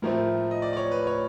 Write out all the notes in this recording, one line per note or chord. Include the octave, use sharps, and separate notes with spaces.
A2 F3 A3 C4 A#4
D#5
D5
D5
C#5
B4
C#5